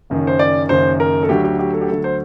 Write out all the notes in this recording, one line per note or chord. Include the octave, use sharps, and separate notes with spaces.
F#1 F#2 D#3
C5
D5
F#1 F#2 D#3 C5
A#4
A4
D2 D3 F#3 G4
G4
G4
A4
G4
D2 D3 F#3 A4
C5